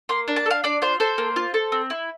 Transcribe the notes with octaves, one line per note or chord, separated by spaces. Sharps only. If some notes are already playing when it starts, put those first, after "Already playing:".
A#3 C6
D4
A5
A4
F5
D4 D5
F4 C5
A4 C5
A#3
F4
A4
C4
E4